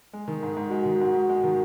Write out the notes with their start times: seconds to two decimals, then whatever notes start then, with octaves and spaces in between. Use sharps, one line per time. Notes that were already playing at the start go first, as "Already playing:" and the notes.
0.13 G#3
0.28 D#3
0.43 G#2
0.57 G#2
0.71 G#3 F#4
0.85 D#3
1.01 G#2
1.15 G#2
1.29 G#3
1.44 D#3